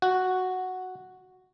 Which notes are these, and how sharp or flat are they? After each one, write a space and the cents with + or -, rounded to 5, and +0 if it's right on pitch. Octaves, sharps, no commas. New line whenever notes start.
F#4 +0 F#5 +0